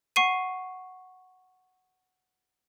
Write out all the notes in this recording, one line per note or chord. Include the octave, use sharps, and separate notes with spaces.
F#5 C#6 C7 D#7